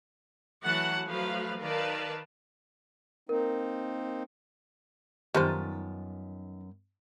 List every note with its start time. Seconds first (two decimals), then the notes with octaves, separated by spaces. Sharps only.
0.63 E3 F#3 A3 F#5 A5
1.07 F3 F#3 A3 B4 F5
1.60 D#3 A#4 B4 D5 F5 A5
3.29 A#3 C4 D#4 A#4
5.34 F#2 D#3 G3 B3 D#4 F4 C5 A5